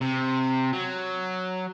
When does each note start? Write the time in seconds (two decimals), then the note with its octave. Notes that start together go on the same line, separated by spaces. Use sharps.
0.01 C3
0.73 F#3